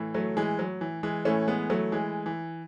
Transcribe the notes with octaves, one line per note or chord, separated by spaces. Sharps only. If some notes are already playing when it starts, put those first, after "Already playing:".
Already playing: A2 E3
F#3 A3
E3 G#3
F#3
E3
E3 G#3
A2 E3 A3 C#4
G#3 B3
F#3 A3
E3 G#3
E3